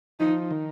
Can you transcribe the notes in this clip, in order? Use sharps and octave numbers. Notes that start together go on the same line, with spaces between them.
F3 D#4
D#3